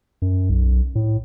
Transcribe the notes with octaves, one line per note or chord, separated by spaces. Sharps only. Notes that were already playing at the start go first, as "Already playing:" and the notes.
F#2
B1
A2